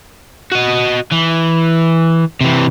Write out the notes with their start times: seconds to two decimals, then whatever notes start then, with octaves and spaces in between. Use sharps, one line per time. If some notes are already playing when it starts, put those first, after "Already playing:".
0.52 F#4 D#5
1.11 E3
2.41 C3 E3